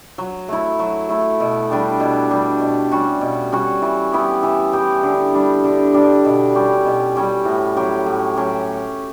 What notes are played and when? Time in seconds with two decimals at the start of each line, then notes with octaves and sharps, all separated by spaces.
0.18 F#3
0.48 A3 E4
0.79 F#3
1.09 A3 E4
1.40 B2
1.70 G3 D4 G4
2.00 B2
2.31 G3 D4 G4
2.61 B2
2.92 G3 C#4 F#4
3.21 B2
3.52 G3 C#4 F#4
3.82 E3
4.12 B3 E4 G4
4.43 E3
4.73 B3 E4 G4
5.03 D3
5.34 G3 D4
5.64 D3
5.94 G3 D4
6.25 B2
6.54 G3 C#4 G4
6.85 B2
7.15 G3 C#4 G4
7.45 A2
7.76 F#3 C#4 G4
8.06 A2
8.36 F#3 C#4 G4